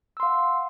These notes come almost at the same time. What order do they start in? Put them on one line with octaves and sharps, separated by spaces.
E6 C6 F5 F#5